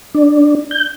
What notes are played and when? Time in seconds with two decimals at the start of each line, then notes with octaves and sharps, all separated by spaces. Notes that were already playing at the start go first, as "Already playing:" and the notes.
0.15 D4
0.71 G6